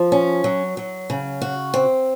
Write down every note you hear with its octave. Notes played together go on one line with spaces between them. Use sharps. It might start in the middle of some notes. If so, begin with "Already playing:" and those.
Already playing: F3
C#4
F#3
F#3
C#3
F#4
C4